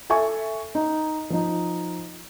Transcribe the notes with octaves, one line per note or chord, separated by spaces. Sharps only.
A4 E5 G#5 C#6
D#4
F3 D#4